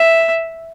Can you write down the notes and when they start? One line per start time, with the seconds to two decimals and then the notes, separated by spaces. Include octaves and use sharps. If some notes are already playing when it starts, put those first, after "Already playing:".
Already playing: E5